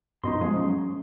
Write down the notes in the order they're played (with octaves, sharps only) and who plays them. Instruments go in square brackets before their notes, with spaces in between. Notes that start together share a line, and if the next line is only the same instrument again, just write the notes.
[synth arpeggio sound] F#2 B2 [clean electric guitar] D#4 D#5 C6
[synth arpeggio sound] F3 G#3 [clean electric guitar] G#4
[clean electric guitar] F#3 C#4